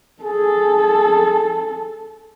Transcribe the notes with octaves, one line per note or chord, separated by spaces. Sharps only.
G#4 A4